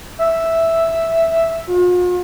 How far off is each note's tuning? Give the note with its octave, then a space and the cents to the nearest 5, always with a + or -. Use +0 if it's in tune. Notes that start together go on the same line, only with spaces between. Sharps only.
E5 +0
F4 +45